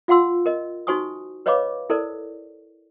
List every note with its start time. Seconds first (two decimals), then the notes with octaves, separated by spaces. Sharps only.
0.08 F4 F5 F#5 C6 E6
0.46 A#4 D#5
0.87 D#4 F#4 C5 G#5 C#6 D#6
1.46 B4 C#5 D#5 F5 B5 D6
1.90 E4 A4 A#4 C5 D5